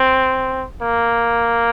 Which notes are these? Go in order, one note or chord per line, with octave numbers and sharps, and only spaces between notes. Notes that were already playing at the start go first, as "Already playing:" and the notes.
Already playing: C4
A#3